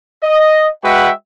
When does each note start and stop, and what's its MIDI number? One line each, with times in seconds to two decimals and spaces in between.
0.23 0.68 75
0.84 1.10 56
0.84 1.10 66
0.84 1.10 71
0.84 1.10 76
0.84 1.10 78
0.84 1.10 79